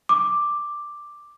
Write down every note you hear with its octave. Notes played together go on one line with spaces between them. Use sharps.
D6